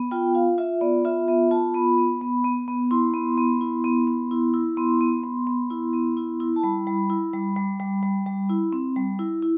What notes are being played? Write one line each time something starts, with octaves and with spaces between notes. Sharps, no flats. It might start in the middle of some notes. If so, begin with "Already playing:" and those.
Already playing: B3
F4 G5
F4 F5
F4 E5
B3 D5
F4 E5
B3 E5
F4 A5
B3 B5
B3
B3
B3
B3
E4 C6
B3
B3
E4
B3
B3
E4
E4
B3 C6
B3
B3
B3
E4
B3
E4
E4
A5
G3 B5
G3
E4
G3
G3
G3
G3
G3
E4
C4
G3
E4
E4